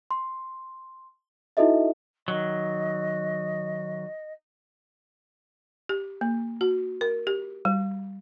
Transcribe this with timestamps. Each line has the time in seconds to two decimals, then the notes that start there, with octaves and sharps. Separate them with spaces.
0.11 C6
1.57 D#4 E4 F#4 A4 D#5 E5
2.28 D#3 F#3 D#5
5.89 G4
6.21 A#3
6.61 F#4
7.01 A#4
7.27 G4
7.65 G3